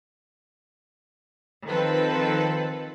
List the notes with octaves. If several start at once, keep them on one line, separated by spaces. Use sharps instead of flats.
D#3 F3 C4 A4 B4